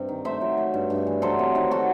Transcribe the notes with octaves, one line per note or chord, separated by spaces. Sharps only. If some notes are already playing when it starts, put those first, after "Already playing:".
Already playing: G2 C3
D#3
A3 C5 E5
F#3
A3
G2
G2
E3
F#3 A4 C5
C3
D#3
F#4 A4